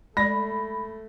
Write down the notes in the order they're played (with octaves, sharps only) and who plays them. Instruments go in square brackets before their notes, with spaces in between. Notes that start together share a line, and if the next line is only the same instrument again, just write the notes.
[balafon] G#3 D5 [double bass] A3 [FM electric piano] B5 [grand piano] A#6